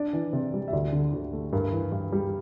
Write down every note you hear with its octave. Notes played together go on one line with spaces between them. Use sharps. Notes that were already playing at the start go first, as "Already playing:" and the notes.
Already playing: D4 D5
E3
C3
G3
E5
D2 D5
D3
D2
A3
G2 A#4
E3
G2
G3